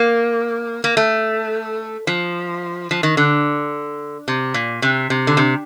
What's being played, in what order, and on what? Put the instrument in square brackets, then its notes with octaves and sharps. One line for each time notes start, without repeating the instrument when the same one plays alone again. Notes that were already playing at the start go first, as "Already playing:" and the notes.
Already playing: [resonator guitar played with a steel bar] A#3
A#3
A3
F3
F3
D#3
D3
C3
A#2
C3
C3
D3
C3